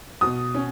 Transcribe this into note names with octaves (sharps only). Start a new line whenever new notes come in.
B2 D#6
C#4